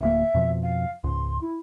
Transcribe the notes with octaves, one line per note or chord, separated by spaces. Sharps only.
D1 D2 A#3 E5
F2 B2 F3
F5
C#2 G#2 C6
E4